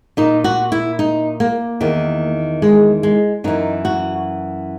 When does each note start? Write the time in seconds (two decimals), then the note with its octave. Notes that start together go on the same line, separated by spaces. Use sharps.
0.17 A#2 D#4
0.44 F#4
0.72 E4
0.99 D#4
1.40 A#3
1.81 E2 D#3
2.62 G#3
3.03 G#3
3.44 F#2 E3 D#4
3.85 F#4